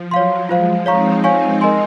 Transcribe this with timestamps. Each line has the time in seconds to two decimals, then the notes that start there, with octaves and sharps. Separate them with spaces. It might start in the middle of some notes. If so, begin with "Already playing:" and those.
Already playing: F3
0.11 F#3 C#5 F5 C6
0.49 F3 G#3 F4 C5 F5
0.86 C4 D#4 C#5 F5 A#5 C#6
1.24 C#5 F5 G#5 C#6
1.61 A#4 D#5 G#5 C6